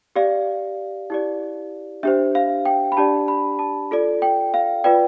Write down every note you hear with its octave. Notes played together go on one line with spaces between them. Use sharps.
G4 D5 F5
E4 G4 D5
D4 G4 C5 E5
F5
G5
B5
D4 G4 D5 A5
B5
A5
F4 A4 D5
G5
F5
F4 B4 D5 G5